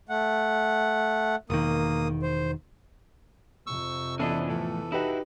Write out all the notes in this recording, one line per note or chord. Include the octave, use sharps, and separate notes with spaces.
A3 F#5
E1 D#3 A#3 D#6
C5
F2 C3 C#6 E6
E3 B3 C#4 D4 E4 A4 D#5
A2 F3 A4
D#4 E4 F#4 G4 B4